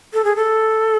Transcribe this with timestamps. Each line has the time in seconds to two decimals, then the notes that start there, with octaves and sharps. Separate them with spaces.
0.13 A4
0.24 G#4
0.36 A4